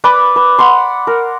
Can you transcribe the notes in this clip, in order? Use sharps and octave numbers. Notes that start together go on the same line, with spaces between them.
B4 D5 B5
B4
F#5 B5 C6
A#4